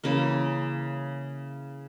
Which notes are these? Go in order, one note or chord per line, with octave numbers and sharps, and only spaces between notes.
C#3 E3 A#3